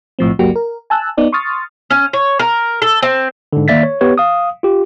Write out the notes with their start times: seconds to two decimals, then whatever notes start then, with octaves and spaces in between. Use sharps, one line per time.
0.19 B1 A2 F3 C4
0.39 G1 C#2 F#3 A#3 F#4 G4
0.56 A#4
0.90 G#5 A5 E6 F#6
1.17 B3 D#4 D5
1.33 C6 C#6 D#6 F6 A6
1.91 C#4
2.13 C#5
2.39 A#4
2.82 A4
3.03 C4
3.53 G#2 D3
3.68 D#3 A#3 D5 E5 A6 B6
3.83 C#5
4.01 B3 G4 B4 C#5
4.18 F5 D#6
4.63 F4 G4